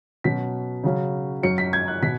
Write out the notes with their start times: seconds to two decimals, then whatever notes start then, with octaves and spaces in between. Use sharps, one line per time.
0.24 B2 F#3 C#4 B6
0.84 C#3 F#3 C#4
1.43 F#2 F#3 C#4 C#7
1.58 B6
1.73 G#6
1.88 F#6
2.02 B2 B6